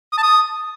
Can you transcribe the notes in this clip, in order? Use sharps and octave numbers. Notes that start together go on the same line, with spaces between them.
D#6
A5
D#6